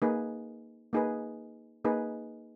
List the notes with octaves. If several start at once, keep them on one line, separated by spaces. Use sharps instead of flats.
A#3 D#4 G#4 B4
A#3 D#4 G#4 B4
A#3 D#4 G#4 B4